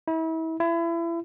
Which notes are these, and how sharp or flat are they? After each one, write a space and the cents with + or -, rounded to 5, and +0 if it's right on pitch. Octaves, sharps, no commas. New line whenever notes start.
E4 -35
E4 +30